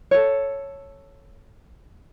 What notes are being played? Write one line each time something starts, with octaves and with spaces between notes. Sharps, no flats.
A4 C#5